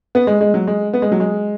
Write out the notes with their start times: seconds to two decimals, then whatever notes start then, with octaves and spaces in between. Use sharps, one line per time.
0.15 B3
0.27 G#3
0.41 G#3
0.54 F#3
0.67 G#3
0.93 B3
1.02 G#3
1.12 F#3
1.20 G#3